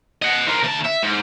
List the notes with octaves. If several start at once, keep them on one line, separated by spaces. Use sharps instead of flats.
D#5 F#5
A#4 C5
D2 A5
E5
G#2